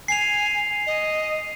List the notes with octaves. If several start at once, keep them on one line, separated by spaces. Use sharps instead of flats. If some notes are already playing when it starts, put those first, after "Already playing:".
G#5 C7 F7
D#5